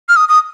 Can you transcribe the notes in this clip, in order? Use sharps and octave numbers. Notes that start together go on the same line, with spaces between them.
F6
D#6
D#6